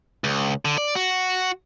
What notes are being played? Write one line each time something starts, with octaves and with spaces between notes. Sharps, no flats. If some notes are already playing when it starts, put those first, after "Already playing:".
C#2
D3
D5
F#4